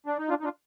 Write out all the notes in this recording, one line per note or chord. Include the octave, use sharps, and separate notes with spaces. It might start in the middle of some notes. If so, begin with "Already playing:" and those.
D4
D#4
D4 F4
D#4
D4 F4